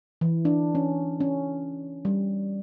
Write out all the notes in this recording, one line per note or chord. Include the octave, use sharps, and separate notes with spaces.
E3
D4
C#4
C#4
G3